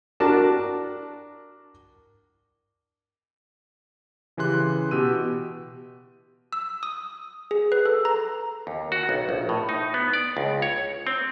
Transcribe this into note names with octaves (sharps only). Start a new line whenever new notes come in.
D4 F#4 A#4 A5
C#3 E3 G4 C6 F#6
B2 G4 E6 D#7
E6
D#6
G#4
B4
A4
A#5
D#2
F#4
B1
A#1
A2
D#4
B3
D5
C#2
C#5
C4